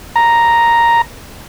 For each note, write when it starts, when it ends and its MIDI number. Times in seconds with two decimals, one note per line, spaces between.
0.16 1.02 82